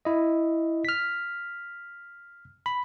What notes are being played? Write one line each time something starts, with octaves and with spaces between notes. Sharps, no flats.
E4 D#5
F6 B6
B5